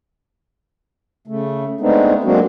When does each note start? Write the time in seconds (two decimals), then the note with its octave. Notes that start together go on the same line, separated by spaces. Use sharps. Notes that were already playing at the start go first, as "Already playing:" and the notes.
1.28 C#3 A3
1.81 G#3 A3 B3 C4 D4 D#4
2.24 F#3 G#3 A#3 C4 D4 F#4